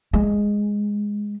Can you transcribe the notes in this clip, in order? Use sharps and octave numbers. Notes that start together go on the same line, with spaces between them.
G#3